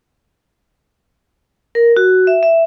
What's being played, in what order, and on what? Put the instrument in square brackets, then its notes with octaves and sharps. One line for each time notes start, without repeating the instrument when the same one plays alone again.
[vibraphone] A#4
F#4
E5
E5